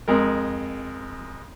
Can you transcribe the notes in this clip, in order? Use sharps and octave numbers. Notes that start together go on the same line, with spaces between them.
F2 G#3 A#4